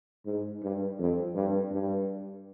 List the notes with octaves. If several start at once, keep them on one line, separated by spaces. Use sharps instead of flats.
G#2
G2
F2
G2
G2